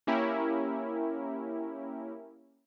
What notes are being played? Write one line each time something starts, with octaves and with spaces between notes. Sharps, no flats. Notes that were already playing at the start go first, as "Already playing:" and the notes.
A#3 C#4 E4 G4 A#4